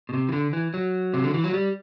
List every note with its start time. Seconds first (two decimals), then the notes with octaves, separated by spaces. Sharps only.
0.09 B2
0.14 C3
0.29 E3
0.32 D3
0.53 E3
0.74 F#3
1.14 C3
1.24 D3
1.34 E3
1.44 F#3
1.54 G3